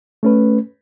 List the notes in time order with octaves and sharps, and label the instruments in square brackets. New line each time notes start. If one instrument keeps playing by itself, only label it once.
[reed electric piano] A3 C#4 B4